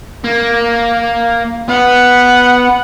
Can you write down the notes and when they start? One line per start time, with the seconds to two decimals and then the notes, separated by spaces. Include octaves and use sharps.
0.24 A#3
1.69 B3 F#5